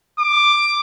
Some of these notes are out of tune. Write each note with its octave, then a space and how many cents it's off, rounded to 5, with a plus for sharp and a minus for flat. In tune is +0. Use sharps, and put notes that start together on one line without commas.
D6 +10